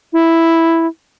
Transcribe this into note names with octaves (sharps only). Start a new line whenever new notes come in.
E4